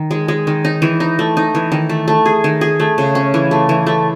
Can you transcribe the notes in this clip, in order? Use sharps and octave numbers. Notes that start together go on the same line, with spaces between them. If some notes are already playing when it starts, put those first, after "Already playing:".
Already playing: D#3
G#3
G#3
D#3
D#4
E3
D#4
A3
D#4
E3
D#3
A3
A3
G#4
D#3
G#4
A3
C#3
C#4
E3
A3
E3
A3